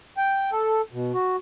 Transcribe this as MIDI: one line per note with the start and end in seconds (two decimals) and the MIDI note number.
0.17 0.50 79
0.52 0.81 69
0.93 1.12 47
1.14 1.36 66